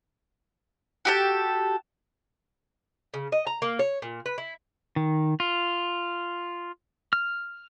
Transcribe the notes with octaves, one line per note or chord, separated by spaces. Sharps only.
F#4 G4 A4
C#3
D#5
A#5
A#3
C#5
A#2
B4
E4
D#3
F4
F6